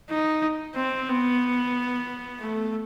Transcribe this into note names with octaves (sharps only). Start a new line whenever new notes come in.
D#4
C4
B3
A3